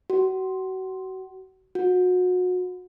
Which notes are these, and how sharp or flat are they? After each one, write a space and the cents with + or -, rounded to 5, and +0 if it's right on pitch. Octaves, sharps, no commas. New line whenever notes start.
F#4 +30
F#4 -30